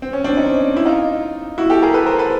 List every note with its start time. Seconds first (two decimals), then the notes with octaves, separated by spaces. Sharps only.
0.02 C4
0.13 C#4
0.24 C4 D4
0.37 C#4 D#4
0.77 E4
0.86 D#4 F4
1.58 E4 F#4
1.70 G4 A4
1.82 G#4 A#4
1.94 A4 B4
2.06 A#4 C5
2.18 A4 B4